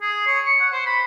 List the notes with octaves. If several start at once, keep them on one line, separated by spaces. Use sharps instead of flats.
G#4
C#5
C#6
F#5
C5
B5